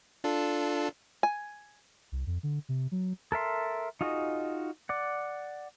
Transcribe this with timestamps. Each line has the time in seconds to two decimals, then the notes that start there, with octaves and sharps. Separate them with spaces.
0.24 D4 F4 A4
1.23 G#5
2.12 C2
2.27 F2
2.43 D3
2.69 C3
2.92 F#3
3.32 A4 A#4 E5 C6
4.01 D#4 F4 F#4 G#4 D#5
4.89 D5 F#5